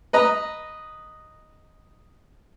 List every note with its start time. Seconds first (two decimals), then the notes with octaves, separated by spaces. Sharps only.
0.13 B4 D#5 A#5